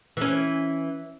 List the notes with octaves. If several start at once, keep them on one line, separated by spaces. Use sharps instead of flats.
E3 C#4